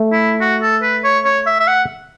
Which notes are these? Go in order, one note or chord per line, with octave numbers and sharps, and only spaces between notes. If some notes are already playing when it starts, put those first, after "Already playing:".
Already playing: A3
E4
F#4
A4
B4
C#5
C#5
E5
E5
F#5